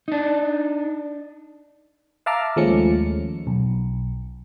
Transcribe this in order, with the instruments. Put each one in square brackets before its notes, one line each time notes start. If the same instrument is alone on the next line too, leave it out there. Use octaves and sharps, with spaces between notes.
[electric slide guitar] D4 D#4
[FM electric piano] E5 F5 A5 A#5 D6 F6
D#2 F3 G#3 A3 C#4 C#7
B1